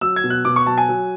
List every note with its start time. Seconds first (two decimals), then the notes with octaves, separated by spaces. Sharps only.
0.01 F#3 E6
0.16 G#6
0.24 B2
0.30 F#6
0.45 B2 D6
0.56 C#6
0.66 F#3 A5
0.78 G#5
0.89 F#3